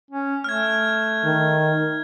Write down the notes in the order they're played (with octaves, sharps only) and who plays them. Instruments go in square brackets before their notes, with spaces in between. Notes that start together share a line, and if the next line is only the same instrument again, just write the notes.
[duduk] C#4
[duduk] A3 [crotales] F6 G#6
[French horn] D#3